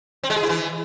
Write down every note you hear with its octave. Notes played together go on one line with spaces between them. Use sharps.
C4
G#3
G#4
E4
E3